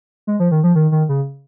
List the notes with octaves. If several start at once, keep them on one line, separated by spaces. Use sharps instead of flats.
G#3
F3
D#3
F3
D#3
D#3
C#3